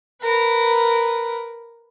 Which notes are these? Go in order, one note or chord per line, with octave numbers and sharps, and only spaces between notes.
A#4 B4